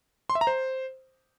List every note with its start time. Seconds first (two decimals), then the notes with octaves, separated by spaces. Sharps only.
0.30 C6
0.35 E5
0.41 A#5
0.47 C5